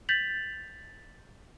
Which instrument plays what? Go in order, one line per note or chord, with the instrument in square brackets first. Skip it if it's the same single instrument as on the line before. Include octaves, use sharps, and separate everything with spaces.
[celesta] G6 A6 B6 F7 F#7